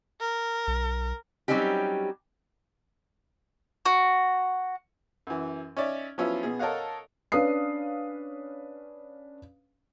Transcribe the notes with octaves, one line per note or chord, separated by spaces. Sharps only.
A#4
B1
F#3 G3 C4 C#4 D#4 G4
F#4
F#2 E3
C#4 D#4 C#5 D5 E5
F3 F#3 B3 C#4 E4 F4
B2 B3 G#4
A4 A#4 C#5 D#5 F5 F#5
C#4 D4 B4 F5 D#6 C7